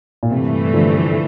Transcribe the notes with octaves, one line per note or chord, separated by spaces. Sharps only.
A#2
G2 C3 E3 A3
D3 F3